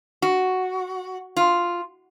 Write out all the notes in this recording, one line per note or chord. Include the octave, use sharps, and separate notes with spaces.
F#4
F4